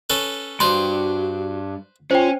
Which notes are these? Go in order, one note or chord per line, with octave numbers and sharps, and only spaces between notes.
C#4 A4 B4
G2 F#4 B4 C5 C6
C#4 F4 C5 G5